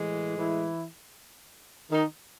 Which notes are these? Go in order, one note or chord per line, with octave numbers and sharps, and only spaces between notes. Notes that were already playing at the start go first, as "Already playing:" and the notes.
Already playing: A2 E3 G#3
E3 E4
D#3 D#4